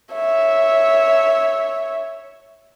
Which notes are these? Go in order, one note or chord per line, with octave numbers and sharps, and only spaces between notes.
C#5 E5